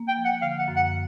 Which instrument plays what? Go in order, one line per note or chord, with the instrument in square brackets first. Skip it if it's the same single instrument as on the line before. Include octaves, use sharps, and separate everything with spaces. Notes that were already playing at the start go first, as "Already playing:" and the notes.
Already playing: [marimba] A#3
[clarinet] G5
[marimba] F3
[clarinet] F#5
[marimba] D3 [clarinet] F5
[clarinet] F#5
[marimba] F#2
[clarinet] F#5